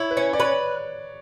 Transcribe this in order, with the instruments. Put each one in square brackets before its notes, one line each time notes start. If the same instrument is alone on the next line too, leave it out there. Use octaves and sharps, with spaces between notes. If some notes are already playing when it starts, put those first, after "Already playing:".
Already playing: [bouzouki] E4 [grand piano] C#5
[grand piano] B4
[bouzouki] C#4 [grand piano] C#5
[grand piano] D5
[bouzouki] B4 [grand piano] C#5